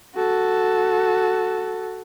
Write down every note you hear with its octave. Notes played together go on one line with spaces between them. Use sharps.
F#4 A4